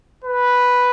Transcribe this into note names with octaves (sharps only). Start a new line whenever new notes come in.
B4